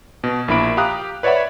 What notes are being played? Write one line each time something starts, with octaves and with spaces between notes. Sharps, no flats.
B2
A#1 A#3 E4 B5 D7
G4 F5 A#5 D#6 F#6
B4 C#5 D5 E5 F#5 B5